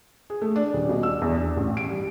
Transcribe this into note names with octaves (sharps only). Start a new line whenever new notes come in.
G#4
A3
D4
D#1
B2
E6
E2
D4
A1
D7
G3